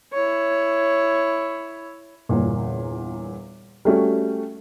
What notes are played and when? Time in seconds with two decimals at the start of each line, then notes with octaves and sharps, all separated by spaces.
0.13 E4 C#5
2.29 G1 E2 A#2
3.85 G3 A3 C#4 F#4